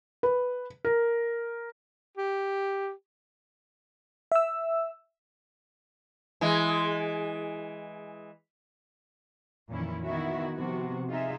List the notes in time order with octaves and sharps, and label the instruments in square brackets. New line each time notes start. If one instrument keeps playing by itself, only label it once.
[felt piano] B4
A#4
[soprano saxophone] G4
[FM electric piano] E5 E6
[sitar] E3 G#3
[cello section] F2 A#2 D#3 E3 C#4 E4
D#3 B3 E4 F#4 E5
C3 F3 B3 F#4
C3 D#4 F4 G#4 E5